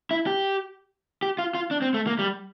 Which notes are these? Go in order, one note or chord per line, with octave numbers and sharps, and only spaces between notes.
E4
G4
G4
F4
F4
D4
C4
A3
A#3
G3